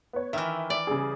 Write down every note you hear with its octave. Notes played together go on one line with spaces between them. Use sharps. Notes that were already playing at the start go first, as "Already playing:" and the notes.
B3 C#5
D#3 E3 E5 F6
D5
C#3 G3 G#4